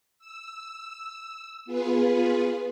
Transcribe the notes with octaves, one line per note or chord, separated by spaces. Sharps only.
E6
B3 F4 G#4 B4